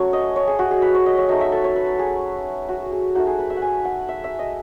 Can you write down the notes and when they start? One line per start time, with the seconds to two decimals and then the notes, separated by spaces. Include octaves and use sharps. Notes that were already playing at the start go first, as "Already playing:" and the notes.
Already playing: F#3 A3 C#4 C#5 F#5
0.13 D#5
0.36 C#5
0.47 G#4
0.59 F#4
0.71 G#4
0.82 B4
0.95 C#5
1.06 D#5
1.18 C#5
1.29 F#3 A3 D#4 D#5
1.41 E5
1.52 A4
1.64 C#5
1.76 B4
1.99 G#4
2.69 F#4
2.92 G#4
3.15 A3 D#4 F#4
3.27 G#4
3.39 B4
3.50 E5
3.57 F#5
3.62 G#5
3.85 F#5
4.08 E5
4.24 E5
4.39 D#5